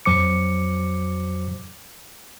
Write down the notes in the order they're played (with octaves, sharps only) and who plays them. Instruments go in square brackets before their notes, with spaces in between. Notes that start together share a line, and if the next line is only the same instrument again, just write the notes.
[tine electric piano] F2 F#3 C5 D6 C#7